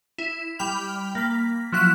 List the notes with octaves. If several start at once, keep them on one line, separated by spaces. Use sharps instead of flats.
E4
G3 G5 B5 F6 F7
A#3 B6
F3 F#3 E4 F#5 F#6 B6